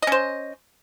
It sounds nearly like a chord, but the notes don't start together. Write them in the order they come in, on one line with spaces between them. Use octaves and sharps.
D#5 C#4 C5